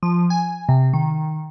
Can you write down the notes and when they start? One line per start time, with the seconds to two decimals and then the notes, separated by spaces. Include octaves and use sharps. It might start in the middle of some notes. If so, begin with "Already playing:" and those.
0.03 F3
0.30 G#5
0.69 C3
0.93 D#3